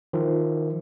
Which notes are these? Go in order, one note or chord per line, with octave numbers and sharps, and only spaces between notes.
D#3 F3